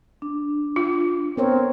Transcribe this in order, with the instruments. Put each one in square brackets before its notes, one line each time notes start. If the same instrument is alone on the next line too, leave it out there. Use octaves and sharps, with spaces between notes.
[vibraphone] D4
[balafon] F4
[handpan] B3 A#4 C#5 [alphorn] C4